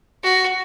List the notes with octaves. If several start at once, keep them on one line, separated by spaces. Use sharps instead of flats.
F#4